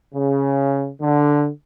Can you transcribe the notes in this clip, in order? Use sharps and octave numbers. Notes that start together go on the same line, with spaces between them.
C#3
D3